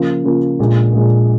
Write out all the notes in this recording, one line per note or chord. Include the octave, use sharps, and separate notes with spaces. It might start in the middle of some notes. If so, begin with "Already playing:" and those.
Already playing: C#3 F3 A#3 F4
C#3 F3 A#3 F4
A#1 A#2 G#3
A#1 A#2 G#3